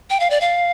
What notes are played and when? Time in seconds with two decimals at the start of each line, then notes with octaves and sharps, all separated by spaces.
0.10 G5
0.20 F5
0.30 D5
0.41 F5